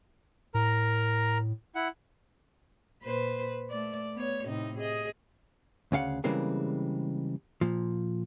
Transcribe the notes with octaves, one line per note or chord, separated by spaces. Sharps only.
A2 A#4 A#5
E4 F#5
A#2 B4 C5
A3 D5
B3 C#5
A2 C3 D#4
G#4 D#5
D2 C#3 F5 F#5
C#3 E3 G3 G#3 A#3 C4
A#2 F3